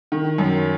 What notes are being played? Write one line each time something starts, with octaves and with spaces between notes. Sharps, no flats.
D#3
F#2